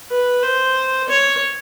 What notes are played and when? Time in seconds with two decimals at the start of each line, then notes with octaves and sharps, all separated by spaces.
0.10 B4
0.43 C5
1.09 C#5